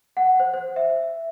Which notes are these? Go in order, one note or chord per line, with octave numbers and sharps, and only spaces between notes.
F#5
C5
C5
E5